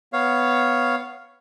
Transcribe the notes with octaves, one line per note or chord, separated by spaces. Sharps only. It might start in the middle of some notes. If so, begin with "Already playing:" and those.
B3 C#5 F5